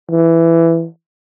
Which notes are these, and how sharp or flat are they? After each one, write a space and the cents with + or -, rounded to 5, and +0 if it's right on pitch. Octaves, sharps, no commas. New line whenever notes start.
E3 +10